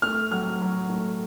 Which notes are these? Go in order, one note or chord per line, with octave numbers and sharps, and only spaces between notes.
A3 F6
F#3 F6
F#3
A3